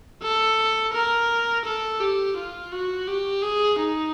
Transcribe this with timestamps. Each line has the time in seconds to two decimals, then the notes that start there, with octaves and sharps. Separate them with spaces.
0.22 A4
0.94 A#4
1.65 A4
2.00 G4
2.36 F4
2.72 F#4
3.07 G4
3.42 G#4
3.79 D#4